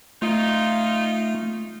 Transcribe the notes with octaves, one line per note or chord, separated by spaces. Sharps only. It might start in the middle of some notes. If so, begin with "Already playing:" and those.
A3 D#4 F4